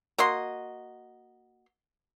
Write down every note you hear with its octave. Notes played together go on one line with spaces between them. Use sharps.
A#3 F#4 D#5 C6